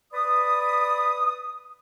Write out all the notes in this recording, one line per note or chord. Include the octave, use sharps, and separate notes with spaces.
B4 D5 B5 D#6